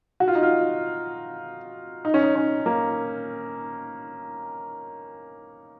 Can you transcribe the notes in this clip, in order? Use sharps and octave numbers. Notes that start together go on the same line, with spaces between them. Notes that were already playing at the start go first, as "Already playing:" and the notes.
F#4
F4
D#4
F4
D#4
C#4
D#4
C#4
A#3